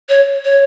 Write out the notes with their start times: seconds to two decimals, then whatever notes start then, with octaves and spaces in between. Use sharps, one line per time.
0.09 C#5
0.45 C#5